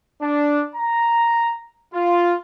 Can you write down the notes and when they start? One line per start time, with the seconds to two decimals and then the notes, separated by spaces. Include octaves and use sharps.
0.22 D4
0.76 A#5
1.94 F4